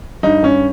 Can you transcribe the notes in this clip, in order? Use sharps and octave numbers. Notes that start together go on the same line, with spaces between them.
G2 D#4
G2 C#4